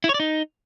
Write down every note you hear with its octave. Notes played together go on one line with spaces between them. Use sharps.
E4
C#5
D5
D#4